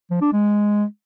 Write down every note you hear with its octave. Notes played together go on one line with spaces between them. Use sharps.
F3
D4
G#3